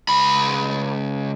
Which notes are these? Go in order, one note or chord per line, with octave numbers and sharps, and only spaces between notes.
C#2 B5